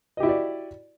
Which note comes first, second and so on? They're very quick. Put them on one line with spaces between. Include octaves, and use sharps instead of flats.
D#5 G4 E4 F#4 D5